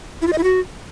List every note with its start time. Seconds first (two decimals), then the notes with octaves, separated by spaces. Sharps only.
0.22 E4
0.27 F4
0.33 D#5
0.38 E4
0.44 F#4